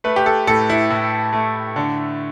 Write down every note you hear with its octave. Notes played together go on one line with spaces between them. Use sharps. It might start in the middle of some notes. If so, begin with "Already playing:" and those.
A3 B4
G4
A4
A2 A4
E4
A2
A3
D3